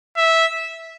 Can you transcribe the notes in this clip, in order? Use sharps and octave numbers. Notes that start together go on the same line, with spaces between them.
E5